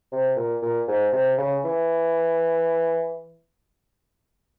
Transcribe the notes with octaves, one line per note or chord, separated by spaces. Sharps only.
C3
A#2
A#2
G#2
C3
C#3
E3